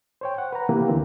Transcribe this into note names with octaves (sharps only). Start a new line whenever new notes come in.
C5 C#5 G5
F#5
B4 A#5
C3 E3 A#3 E4 G4
D2 D3 E3 C4